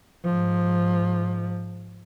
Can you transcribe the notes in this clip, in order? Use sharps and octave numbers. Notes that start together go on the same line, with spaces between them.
G#2 F3